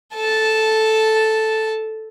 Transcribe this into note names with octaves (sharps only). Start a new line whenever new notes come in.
A4 A5